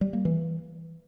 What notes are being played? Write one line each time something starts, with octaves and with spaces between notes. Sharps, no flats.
G3
A#3
E3